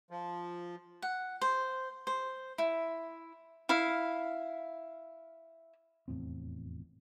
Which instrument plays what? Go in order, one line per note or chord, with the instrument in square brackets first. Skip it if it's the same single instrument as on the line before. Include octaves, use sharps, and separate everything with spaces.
[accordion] F3
[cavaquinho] F#5
C5
C5
E4
E4 F5
[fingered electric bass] F1 E2 A2 C4